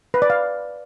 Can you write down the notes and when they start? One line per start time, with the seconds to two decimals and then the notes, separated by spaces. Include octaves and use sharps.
0.14 B4
0.22 D5
0.30 F5